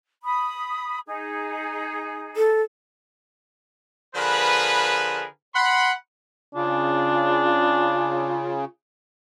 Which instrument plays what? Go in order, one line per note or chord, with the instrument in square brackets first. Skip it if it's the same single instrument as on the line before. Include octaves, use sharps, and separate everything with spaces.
[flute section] B5 D#6
D#4 G#4
[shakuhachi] A4
[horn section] D3 F3 G#4 A#4 B4
F#5 B5 C6
[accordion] C#3 [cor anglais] D4 [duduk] F4